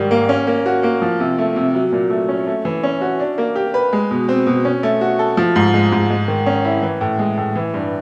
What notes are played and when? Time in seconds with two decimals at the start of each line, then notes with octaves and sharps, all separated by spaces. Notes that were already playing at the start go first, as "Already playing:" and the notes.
Already playing: G#2 D#3 G3
0.11 A#3
0.29 C#4
0.47 A#3
0.66 F#4
0.83 A#3
1.02 F3
1.20 C3
1.38 A3
1.56 C3
1.75 F#3
1.92 A#2
2.10 A3
2.29 C#4
2.47 A3
2.65 E3
2.83 C#4
3.01 F#4
3.20 D4
3.38 A#3
3.56 G4
3.74 B4
3.93 G#3
4.11 B2
4.29 C4
4.47 B2
4.65 C#4
4.83 A3
5.01 F#4
5.19 A4
5.37 F3
5.56 G#2
5.74 G#3
5.92 G#2
6.10 G#3
6.28 D#3
6.46 C#4
6.65 E4
6.82 E3
7.01 A2
7.19 G#3
7.37 A2
7.56 E3
7.74 G2